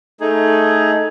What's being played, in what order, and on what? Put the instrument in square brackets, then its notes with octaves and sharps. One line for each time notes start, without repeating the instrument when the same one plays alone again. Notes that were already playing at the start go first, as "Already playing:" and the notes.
[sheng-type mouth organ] A3 D#4 G#4